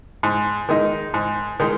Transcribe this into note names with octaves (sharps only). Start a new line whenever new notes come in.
G#2
D#3 G#3 D#4
G#2
D#3 G#3